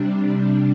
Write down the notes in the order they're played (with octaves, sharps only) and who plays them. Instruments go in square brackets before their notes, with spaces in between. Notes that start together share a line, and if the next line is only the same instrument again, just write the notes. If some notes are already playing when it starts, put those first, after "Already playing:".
Already playing: [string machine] C3 G3 D4